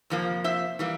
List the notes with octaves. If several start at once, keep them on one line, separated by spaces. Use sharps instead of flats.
F2 C3 F3 A#3
C5 E5
E3 G3 A#3